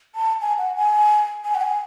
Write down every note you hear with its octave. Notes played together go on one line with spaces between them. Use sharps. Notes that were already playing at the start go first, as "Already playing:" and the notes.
A5
G#5
F#5
G#5
G#5
F#5
G#5